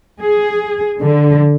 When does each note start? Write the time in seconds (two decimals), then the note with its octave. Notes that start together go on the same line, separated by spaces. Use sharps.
0.21 G#4
1.00 D3